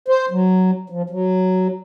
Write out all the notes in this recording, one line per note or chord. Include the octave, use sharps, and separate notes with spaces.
C5
F#3
F3
F#3